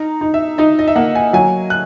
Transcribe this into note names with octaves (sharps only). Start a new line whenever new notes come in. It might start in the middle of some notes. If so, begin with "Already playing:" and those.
Already playing: D#4 A#5
D#4
E5
D#4 D#5
D#5
E5
A#3 F#5
G#5
F#3 G#5
F#6